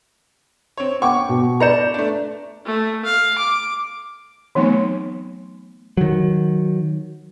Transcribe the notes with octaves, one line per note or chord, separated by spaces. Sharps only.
C4 C#5
F#5 G5 C#6 D6
B2
B4 D5 A#5 G6 C#7 E7
A3 D4
A3
F5
D6
E3 F#3 A3 B3 C4 D#4
D#3 F#3